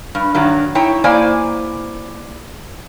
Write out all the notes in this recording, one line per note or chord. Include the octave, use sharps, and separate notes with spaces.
G2
G2 D#3 F#3
D#4 E4 C#5 G5
A#3 E4 C5 D5 G#5